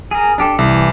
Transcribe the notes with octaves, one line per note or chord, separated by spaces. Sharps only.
G#4 A#4
D4 G4 A4
C2 E3